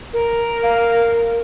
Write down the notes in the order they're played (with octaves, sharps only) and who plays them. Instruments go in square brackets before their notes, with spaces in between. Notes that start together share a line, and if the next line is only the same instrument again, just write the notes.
[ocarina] A#4
[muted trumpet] F5